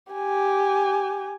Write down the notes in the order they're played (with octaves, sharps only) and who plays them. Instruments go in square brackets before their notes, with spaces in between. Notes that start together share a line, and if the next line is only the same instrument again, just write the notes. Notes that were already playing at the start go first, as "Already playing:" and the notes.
[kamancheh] G4 G#5